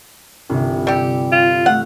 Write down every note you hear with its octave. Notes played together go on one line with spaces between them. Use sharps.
G1 C2
G3 G4 E6 C#7
F4
A3 F5 F#5